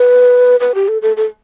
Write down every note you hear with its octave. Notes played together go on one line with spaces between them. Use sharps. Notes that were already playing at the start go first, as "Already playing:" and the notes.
Already playing: B4
B4
G4
A4
A4
A4